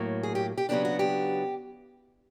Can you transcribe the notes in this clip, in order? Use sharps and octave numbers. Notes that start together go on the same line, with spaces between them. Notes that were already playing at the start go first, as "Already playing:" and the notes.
Already playing: A2 F#3 A#3
G#4
G4
G4
C#3 F#3 B3 D4 G4
F#4
G4